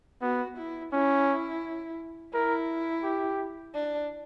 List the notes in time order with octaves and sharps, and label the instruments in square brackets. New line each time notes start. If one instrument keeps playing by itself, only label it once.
[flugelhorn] B3 [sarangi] F#4
[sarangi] E4
[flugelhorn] C#4 [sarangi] E4
[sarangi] E4 [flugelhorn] A#4
[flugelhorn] G4
[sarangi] D4